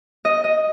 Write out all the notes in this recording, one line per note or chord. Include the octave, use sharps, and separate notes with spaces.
D#5
D#5